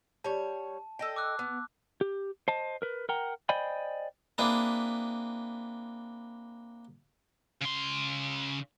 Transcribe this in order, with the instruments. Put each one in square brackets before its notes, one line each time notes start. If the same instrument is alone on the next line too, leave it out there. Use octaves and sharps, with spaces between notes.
[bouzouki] G3 C#5 [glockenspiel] A5
[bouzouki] A4 D#5 G5
[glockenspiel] D6 E6 F#6
[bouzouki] B3
[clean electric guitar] G4
C5 D#5 A5
A#4 B4
A#4 F#5 G5 A#5
C5 D5 D#5 G5 G#5 B5
[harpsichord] A#3 C4 D4 E4 G#4 B4
[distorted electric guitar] C#3 C6